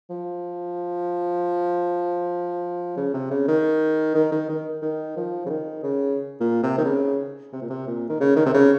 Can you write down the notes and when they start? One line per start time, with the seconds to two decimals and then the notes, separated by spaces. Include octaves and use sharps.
0.10 F3
2.97 C#3
3.14 C3
3.31 C#3
3.48 D#3
4.15 D#3
4.32 D#3
4.49 D#3
4.82 D#3
5.17 F3
5.46 C#3
5.49 D#3
5.83 C#3
6.40 A#2
6.63 C3
6.78 D#3
6.85 C#3
7.53 C3
7.62 A#2
7.70 C3
7.87 A#2
8.09 D#3
8.20 C#3
8.36 D#3
8.46 C3
8.54 C#3